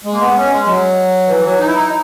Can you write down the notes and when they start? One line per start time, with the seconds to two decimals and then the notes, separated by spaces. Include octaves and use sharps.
0.04 G#3
0.13 A#3
0.20 B3
0.36 C#4
0.51 G#3
0.66 F#3
1.28 E3
1.43 F#3
1.59 D#4
1.67 E4
1.75 D#4